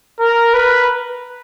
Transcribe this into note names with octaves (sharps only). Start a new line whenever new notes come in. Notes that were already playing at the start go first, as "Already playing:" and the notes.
A#4
B4